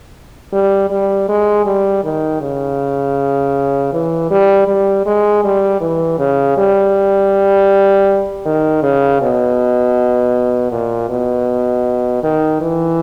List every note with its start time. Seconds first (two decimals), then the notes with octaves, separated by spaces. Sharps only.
0.53 G3
0.90 G3
1.29 G#3
1.66 G3
2.04 D#3
2.42 C#3
3.93 E3
4.31 G3
4.68 G3
5.06 G#3
5.44 G3
5.81 E3
6.19 C#3
6.57 G3
8.45 D#3
8.83 C#3
9.22 B2
10.72 A#2
11.09 B2
12.23 D#3
12.61 E3